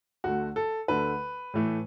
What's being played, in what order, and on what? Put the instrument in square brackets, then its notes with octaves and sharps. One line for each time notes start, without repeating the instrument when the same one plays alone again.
[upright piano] D2 D3 A3 F#4
A4
D2 D3 A3 B4
A2 E3 A3